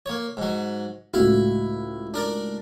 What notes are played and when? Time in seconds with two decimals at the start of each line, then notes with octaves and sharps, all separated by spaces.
0.06 A#3 C#5
0.37 G#2 F#3
1.14 C#2 A2 E4 F#4 F5
2.14 D4 A#4 D5